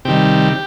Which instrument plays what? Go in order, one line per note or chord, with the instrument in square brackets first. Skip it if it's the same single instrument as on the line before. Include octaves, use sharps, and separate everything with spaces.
[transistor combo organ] C3 D#3 G3 G4